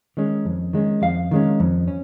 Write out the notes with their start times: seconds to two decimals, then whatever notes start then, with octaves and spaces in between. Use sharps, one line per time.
0.17 D#3 G#3 C#4
0.45 F2
0.73 D#3 G#3 C#4
1.02 F2 F5
1.31 D#3 G#3 C#4
1.60 F2
1.88 C#4